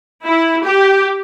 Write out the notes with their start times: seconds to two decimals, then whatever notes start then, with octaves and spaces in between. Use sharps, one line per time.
0.25 E4
0.64 G4